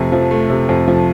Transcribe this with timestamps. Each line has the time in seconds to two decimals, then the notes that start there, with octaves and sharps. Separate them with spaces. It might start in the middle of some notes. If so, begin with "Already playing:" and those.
Already playing: F2 C3 A3
0.12 F3
0.31 A3
0.50 C3
0.69 F2
0.88 F3